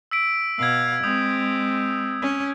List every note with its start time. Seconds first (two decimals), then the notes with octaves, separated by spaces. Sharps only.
0.11 E6 B6 D7
0.59 B2 F5 E6 G#6
1.04 G#3 C4 D#6 G6
2.22 C#4